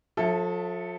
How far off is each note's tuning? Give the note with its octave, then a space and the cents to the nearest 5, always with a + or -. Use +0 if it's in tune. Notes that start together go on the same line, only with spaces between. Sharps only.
F3 +40 A4 +0 E5 +0